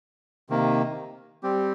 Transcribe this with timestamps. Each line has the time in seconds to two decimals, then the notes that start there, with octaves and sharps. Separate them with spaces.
0.49 C3 D#3 A#3
1.43 G3 C4 G4